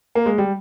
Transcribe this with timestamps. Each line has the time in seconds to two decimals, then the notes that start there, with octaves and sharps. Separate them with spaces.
0.15 A#3
0.26 G#3
0.38 G3